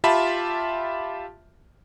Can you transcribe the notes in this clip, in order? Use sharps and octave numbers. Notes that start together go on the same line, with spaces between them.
F4 G4 E5 A5 B5